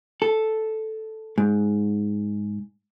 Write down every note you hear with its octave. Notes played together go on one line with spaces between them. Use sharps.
A4
G#2